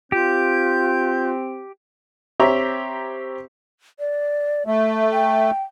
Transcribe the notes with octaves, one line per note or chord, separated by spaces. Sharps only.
C4 F4 G4 G6
C4 G4 C#5 E5 A#5
D5
A3 E5
G5